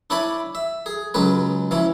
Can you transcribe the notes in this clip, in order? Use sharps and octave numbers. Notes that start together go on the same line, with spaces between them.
D4 E4 C#5 D5 G#5 B5
E5
G#4
C#2 F#3 G#3 C#4 B4
E3 F3 C#4 E4